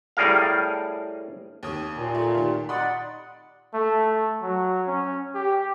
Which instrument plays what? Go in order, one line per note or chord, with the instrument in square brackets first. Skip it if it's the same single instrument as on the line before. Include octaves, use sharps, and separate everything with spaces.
[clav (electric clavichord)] A2 G3 G#4 A#4 F5
[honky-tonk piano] D#2 C#5 D#6
[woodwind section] A#2
[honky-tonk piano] A3
D#3 G4
[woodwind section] D#4 D5 F#5 [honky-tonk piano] B5 C6 D#6
[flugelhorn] A3
F#3
C#4
G4